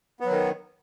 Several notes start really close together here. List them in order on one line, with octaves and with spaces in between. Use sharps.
B3 F#3 D#3